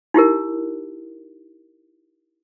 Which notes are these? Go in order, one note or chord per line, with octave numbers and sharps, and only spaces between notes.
D#4 E4 G4 A#4